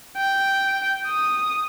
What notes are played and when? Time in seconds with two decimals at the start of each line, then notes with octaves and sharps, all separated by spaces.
0.17 G5
1.08 D#6